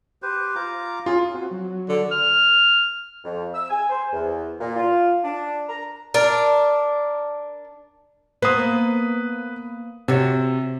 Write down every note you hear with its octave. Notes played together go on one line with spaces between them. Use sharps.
G4 B4 C5
F4 A#5 D6
C#4 F4 G#4
C4 F#4
F#3
D3
F6
F2
E6
G#5
C5
E2
A#2
F4
D4
A#5
D4 A#4
A#3 B3 B4 C5 D#6
C3 F#4 C#5